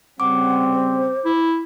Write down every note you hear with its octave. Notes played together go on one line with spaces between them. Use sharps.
C#3 G3 C4 F#5 D6
C5
E4